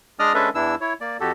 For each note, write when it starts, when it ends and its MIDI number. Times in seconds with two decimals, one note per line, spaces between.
0.20 0.33 56
0.20 0.33 62
0.20 0.33 74
0.20 0.33 75
0.20 0.33 87
0.20 0.33 89
0.34 0.49 56
0.34 0.49 61
0.34 0.49 62
0.34 0.49 69
0.34 0.49 71
0.34 0.49 76
0.55 0.75 40
0.55 0.75 52
0.55 0.75 62
0.55 0.75 64
0.55 0.75 88
0.81 0.93 64
0.81 0.93 73
1.01 1.17 58
1.01 1.17 74
1.20 1.32 41
1.20 1.32 66
1.20 1.32 67
1.20 1.32 69